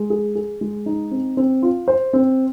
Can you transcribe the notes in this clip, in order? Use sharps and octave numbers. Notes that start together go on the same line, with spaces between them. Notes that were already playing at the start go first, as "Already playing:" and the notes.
Already playing: G#3
G#4
G#4
G#3
D#4
C4
C4
F4
C5
C4